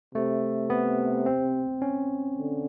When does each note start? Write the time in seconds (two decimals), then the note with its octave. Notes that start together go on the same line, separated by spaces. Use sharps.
0.15 C3 A3
0.70 B3
1.26 C4
1.82 C#4
2.38 D3